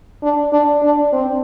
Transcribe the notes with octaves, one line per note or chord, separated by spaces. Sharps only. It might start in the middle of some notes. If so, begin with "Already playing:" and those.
D4
D4
D4
C4